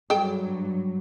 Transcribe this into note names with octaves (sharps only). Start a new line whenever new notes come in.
G2 F#3 G#4 A4 G5